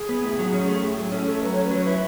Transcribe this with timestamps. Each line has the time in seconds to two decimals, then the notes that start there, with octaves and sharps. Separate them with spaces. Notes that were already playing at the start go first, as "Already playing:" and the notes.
Already playing: G#4
0.09 B3
0.24 A2
0.39 F#3
0.54 C#4
0.68 A3
0.83 A2 G#4
0.97 F#3 G#4
1.12 C#4 A4
1.27 A3 A4
1.42 F#3 B4
1.52 C#4 C#5
1.64 B4
1.71 F#3 C#5
1.84 E4 B4